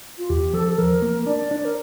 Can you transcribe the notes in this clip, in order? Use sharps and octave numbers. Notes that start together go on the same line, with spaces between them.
F4
E2 G4
F3 A4
A4
F3 A#4
A#3
D4 D5
D4
A#4